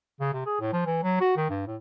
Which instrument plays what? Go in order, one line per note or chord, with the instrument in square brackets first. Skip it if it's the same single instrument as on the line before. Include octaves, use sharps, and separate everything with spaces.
[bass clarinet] C#3
C3
G#4
A2
F3
E3
F#3
F#4
D#3
G2
A2